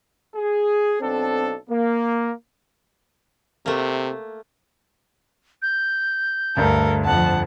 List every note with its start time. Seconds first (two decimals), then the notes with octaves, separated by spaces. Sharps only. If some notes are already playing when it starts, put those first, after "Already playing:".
0.35 G#4
1.01 B1 C4 D4 A4
1.70 A#3
3.66 C3 A3 A#3
5.62 G6
6.57 D2 G2 A3 A4 A#4
7.05 F2 F3 F#5 A5